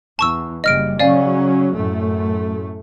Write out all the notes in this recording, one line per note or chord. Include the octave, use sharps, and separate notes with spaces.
E2 A5 C#6 E6
F#1 C#3 G3 D#5 F6 D7
C#3 F#3 C#4 D5 F5 G#5
F#2 A2 A3